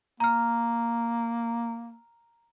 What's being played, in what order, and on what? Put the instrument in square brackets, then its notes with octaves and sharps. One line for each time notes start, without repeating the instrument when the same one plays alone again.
[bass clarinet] A#3 [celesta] A#5 F6